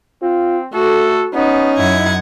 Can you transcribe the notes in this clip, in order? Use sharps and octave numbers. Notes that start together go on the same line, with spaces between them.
C4 F4
A3 F#4 A4
B3 C#4 D#4
F#2 E4 F#5 G#6